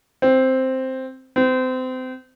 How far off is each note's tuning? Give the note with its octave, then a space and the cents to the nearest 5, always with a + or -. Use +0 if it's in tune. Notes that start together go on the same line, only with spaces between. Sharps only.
C4 +0
C4 -30